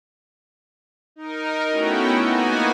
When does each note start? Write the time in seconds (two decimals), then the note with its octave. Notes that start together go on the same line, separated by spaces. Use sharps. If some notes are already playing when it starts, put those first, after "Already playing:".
1.16 D#4 A#4
1.68 A3 B3 C#4 E4 F#4 G5
2.23 A#3 B3 D#4 F#4 G#5